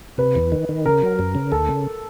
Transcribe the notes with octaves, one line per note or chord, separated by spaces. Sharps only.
C3 B4
E2
D#3
D#3
C#3 A#4
F#3
F#2
C#3
D2 A4
C#3